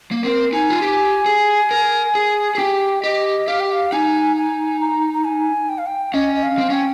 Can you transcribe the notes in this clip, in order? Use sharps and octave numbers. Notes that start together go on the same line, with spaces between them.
A#3
C4 A#4
D#4 G#5
F4
G4
G#4
A#4
G#4
G#4
G4 G5
G4 D#5
G4 F5
G5
F5
D#4 G#5
G#5
A#5
A#5
G#5
G5
F5
G5
C#4 D#5
D#5
F5
C4
C#4 G5